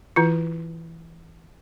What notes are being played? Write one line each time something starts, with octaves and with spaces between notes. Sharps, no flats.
E3 E4 F4